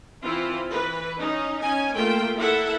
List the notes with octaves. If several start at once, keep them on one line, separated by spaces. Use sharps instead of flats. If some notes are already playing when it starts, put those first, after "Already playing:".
E3 C4 E4 F4
E3 B4
C#4 D#4
C#4 G#5
A3 A#3 F4 G5
A#3 E4 A4 E5 F#5